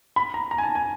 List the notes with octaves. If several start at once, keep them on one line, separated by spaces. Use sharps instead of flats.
B5
A#5
A#5
G#5
A5
G#5